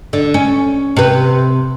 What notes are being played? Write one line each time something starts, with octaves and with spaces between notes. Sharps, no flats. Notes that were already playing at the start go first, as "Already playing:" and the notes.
D3
C#4
C3 B4